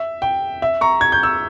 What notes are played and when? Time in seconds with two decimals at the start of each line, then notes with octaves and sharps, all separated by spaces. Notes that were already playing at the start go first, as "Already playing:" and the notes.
Already playing: E5
0.22 G5
0.62 E5
0.81 A#5 C#6
1.01 G#6
1.12 G6
1.23 E6